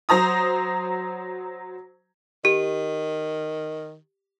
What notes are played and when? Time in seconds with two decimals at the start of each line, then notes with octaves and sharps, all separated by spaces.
0.09 F#3 C5 A#5 D#6
2.45 D#3 G4